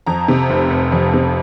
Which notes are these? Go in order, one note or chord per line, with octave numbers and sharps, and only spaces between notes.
F2 A#5
C3
F1
F1
F2
C3